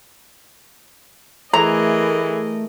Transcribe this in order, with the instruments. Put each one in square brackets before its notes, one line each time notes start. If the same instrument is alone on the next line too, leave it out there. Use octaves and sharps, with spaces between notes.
[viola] E3 G#4 [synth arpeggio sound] A3 [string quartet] A#4 D#5 [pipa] A#5